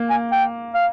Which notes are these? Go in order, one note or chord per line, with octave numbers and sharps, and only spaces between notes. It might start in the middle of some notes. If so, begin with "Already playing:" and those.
Already playing: A#3
G#5
G5
F5